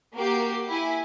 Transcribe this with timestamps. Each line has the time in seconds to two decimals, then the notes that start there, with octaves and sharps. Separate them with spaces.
0.15 A#3 F#4 G4 C7
0.70 E4 G#5